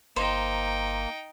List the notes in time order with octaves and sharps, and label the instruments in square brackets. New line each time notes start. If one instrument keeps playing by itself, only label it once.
[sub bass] G1 [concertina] A#3 [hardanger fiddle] D#4 G5 [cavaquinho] C5